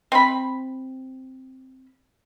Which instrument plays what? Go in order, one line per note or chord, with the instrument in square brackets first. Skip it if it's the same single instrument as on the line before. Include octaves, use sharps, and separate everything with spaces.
[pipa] C4 B5